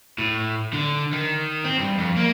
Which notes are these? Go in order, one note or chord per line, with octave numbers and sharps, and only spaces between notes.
A2
D3
D#3
C4
G2
F2
A#3